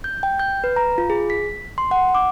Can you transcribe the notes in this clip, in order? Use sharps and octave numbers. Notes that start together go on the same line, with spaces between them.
G6
G5
G6
B4
A#5
F4
G#4
B6
C6
F#5
D6